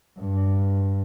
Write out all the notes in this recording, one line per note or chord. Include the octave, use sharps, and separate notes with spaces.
G2